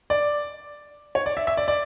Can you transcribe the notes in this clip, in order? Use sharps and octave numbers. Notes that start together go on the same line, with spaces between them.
D5
C#5
D5
E5
E5
D5
D5